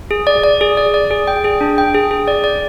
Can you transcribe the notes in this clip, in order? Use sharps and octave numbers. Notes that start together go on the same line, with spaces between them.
G#4
D5
D5
G#4
D5
D5
G#4
G5
G#4
D4
G5
G#4
G#4
D5
D5